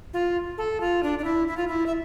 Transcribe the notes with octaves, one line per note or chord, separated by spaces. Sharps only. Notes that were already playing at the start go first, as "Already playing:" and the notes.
F4
A4
F4
D4
D4
E4
E4
F4
E4
E5